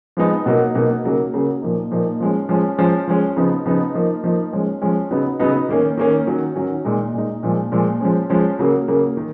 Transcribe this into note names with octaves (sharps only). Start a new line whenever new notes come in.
F3 G#3 B3 D#4
B2 F#3 A#3 D#4
B2 F#3 A#3 D#4
C#3 F#3 A#3
C#3 F#3 A#3
A#2 F3 A#3 D#4
A#2 F3 A#3 D#4
F3 G#3 C#4
F3 G#3 C#4
F3 G#3 C#4
F3 G#3 C#4
C#3 F3 B3 D#4
C#3 F3 B3 D#4
F3 A#3 D#4
F3 A#3 D#4
F3 G#3 C#4
F3 G#3 C#4
C#3 F#3 B3 D#4
C#3 F#3 B3 D#4
D#3 A#3 C#4
D#3 A#3 C#4
D#3 F#3 C#4
D#3 F#3 C#4
A#2 G#3 D#4
A#2 G#3 D#4
A#2 F3 G#3
A#2 F3 G#3
F3 G#3 C#4
F3 G#3 C#4
C#3 F#3 A#3
C#3 F#3 A#3
D#3